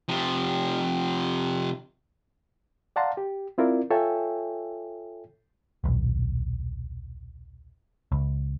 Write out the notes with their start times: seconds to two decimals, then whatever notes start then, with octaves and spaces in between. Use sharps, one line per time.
0.09 C3 F3
2.96 D5 F5 F#5 A5 A#5 C6
3.17 G4
3.58 C4 E4 F4 A#4 D5
3.90 F4 A4 C#5 E5 G5 G#5
5.84 D#1 B1
8.12 C#2